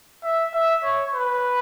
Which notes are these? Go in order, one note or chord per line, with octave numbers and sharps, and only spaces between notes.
E5
E5
C#5
B4